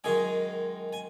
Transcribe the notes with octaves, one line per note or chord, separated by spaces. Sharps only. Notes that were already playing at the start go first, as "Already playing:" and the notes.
F#2 D#3 G#3 G#4 G#5
G#5